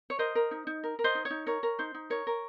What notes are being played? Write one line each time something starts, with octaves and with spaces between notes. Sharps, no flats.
C#5
A#4 C5 D#5
A#4
D#4
D#4
A#4
A#4
C5 D#5
D#4
C#5
D#4
A#4 C#5
A#4
D#4 C5
D#4
A#4 C#5
A#4